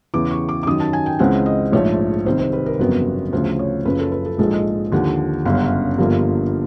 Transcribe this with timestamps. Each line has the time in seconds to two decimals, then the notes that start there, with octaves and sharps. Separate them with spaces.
0.14 E2 C#3 E3 D6
0.31 C#6
0.49 D6
0.63 D6
0.66 F#2 D#3 F#3 D#6
0.80 A5
0.93 G#5
1.06 G5
1.19 C#2 C#3 E3 G#3 C4 F#5
1.46 D#5
1.72 A#1 G#2 F3 A3 C#5
2.26 C2 C3 D#3 C5
2.39 C5
2.53 B4
2.66 A#4
2.79 G1 F2 C#3 F#3 B3
3.33 D2 C#3 F3 C5
3.59 C#5
3.85 F#1 F#2 C#3 F3 B4
3.99 A4
4.12 B4
4.26 A4
4.38 A#1 G#2 F3 G#3 A4
4.53 D#5
4.92 D#2 D3 F3 F#5
5.45 G1 F#2 C#3 F5
5.55 F#5
5.64 F5
5.98 G1 G2 D3 F3 A#3